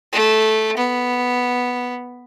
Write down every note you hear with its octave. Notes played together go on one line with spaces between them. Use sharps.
A3
B3